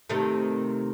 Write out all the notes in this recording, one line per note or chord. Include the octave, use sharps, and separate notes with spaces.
C3 D#3 A3